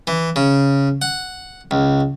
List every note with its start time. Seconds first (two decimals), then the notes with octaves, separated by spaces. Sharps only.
0.07 E3
0.36 C#3
1.02 F#5
1.71 C#2